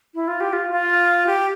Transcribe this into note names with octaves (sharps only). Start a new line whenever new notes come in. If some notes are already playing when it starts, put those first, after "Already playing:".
E4
F4
G4
F4
F4
G4